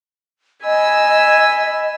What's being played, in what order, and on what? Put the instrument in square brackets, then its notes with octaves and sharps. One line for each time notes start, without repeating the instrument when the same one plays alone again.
[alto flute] D#5 [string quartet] G#5 B5 E6